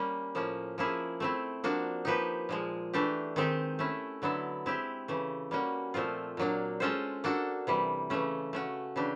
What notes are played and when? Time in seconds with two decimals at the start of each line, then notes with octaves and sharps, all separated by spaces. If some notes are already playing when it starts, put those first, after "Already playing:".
Already playing: G3 A#3 C#4
0.35 A2 F3 A#3 C#4
0.78 F3 A#3 C#4 E4 G#4
1.20 A3 C4 E4
1.64 F3 A#3 D4 F#4
2.05 F3 A#3 D#4 G4 B4
2.49 A#2 F3 G#3
2.93 E3 A3 D4 G4
3.36 D#3 G#3 C4 D#4 G4
3.79 A3 C#4 E4
4.22 D3 F#3 B3 E4 A4
4.66 G#3 C4 E4 G4
5.08 C#3 E3 A3
5.51 G3 A#3 C#4 F#4
5.94 A#2 F3 A3 C4 F4
6.37 A#2 F#3 A#3 D4
6.80 G#3 C#4 F4 A4 C5
7.24 A#3 D4 F#4 A4
7.67 C3 E3 G3
8.10 C#3 E3 A3 C#4
8.53 A3 C#4 F#4
8.96 C#3 E3 A3 D4 G4